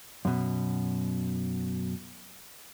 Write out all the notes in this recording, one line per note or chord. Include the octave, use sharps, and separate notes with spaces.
F#2 B2